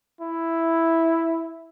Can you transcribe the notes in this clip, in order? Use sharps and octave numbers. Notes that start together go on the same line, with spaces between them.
E4